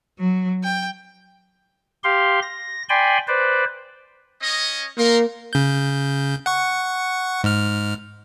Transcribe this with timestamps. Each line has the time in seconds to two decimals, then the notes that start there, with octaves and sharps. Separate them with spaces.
0.19 F#3
0.63 G5
2.04 G4 F5 C6
2.42 A#6
2.89 D5 G5 G#5 B5 C6
3.27 B4 C5 D5
4.41 C#4 D#5
4.98 A#3 D#4 A#4 C6
5.53 C#3 G6
6.46 F#5 C#6
7.44 G#2 F6